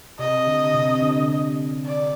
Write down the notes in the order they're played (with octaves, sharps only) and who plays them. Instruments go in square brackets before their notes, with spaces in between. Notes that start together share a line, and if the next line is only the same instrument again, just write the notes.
[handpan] C3 [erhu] D#5
[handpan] D3
C3
D3
[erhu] D5